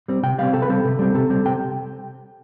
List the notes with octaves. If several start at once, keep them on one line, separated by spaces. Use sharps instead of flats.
G3 C4
C3 G5
G3 C4 F5
C3 A4
B4
G3 C4 A4
C3
G3 C4
C3 A4
G3 C4
C3 G5